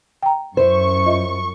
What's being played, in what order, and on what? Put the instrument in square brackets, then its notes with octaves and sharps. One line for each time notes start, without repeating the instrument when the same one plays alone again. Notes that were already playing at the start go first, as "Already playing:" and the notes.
[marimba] G5 A#5
[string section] F#2 C#6 [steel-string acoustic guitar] E4 C5 [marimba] B4
[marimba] F4 D#5 E5